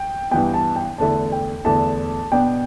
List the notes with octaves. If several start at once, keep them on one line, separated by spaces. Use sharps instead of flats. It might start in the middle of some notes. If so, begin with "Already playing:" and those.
Already playing: G5
G2 E3 B3 G5
A5
G5
E2 D3 A3 E4 A5
G5
E2 D3 A3 E4 A5
B2 B3 D4 G5